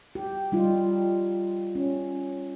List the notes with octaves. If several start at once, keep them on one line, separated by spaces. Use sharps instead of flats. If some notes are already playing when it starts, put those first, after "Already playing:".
G4
G3 D#4 F4
C#4